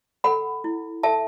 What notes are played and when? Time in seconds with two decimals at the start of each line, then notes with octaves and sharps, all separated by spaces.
0.24 A4 F#5 B5
0.64 E4
1.03 A4 E5 A5